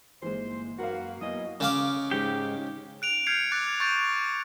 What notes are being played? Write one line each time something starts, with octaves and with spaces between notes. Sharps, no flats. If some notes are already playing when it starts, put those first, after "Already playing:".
G1 E3 G#3 A#3 D#4 C5
F#2 A#3 F#4 A#4 B4 F5
B2 F#3 A#3 B3 E4 D#5 G#5
C#3 F5 D6
G#2 G4
F#6 D7 F7
F6 G6 G#6 C7 C#7 F7
D6 F#6 G#6 A6
C#6 G6 A6 D7